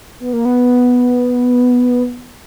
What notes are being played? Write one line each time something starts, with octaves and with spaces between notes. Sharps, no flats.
B3
A#3
B3